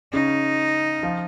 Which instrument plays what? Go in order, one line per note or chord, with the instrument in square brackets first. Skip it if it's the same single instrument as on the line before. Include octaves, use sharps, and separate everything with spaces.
[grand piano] C#3 C#4 [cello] D#4
[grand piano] F3 F4